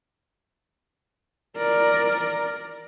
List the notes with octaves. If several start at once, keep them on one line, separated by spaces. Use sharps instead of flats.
A#4 D5